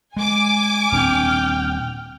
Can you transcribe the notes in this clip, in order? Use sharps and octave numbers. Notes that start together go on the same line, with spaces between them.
G#3 G#5 D6
D#1 C4 D4 G5 F6